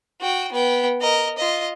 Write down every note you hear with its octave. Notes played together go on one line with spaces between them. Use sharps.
F#4 G5
B3 G5
A#4 D#5
F4 D#5